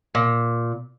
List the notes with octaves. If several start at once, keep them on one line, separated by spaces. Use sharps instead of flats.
A#2